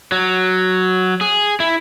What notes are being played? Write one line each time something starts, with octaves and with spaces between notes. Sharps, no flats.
F#3
G#4
E4